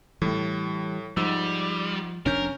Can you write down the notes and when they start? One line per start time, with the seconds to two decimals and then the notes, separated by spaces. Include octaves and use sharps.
0.22 A2 E3 G3
1.17 G#2 F3 G3 E6
2.26 F1 C3 C#4 D4 A#4 G6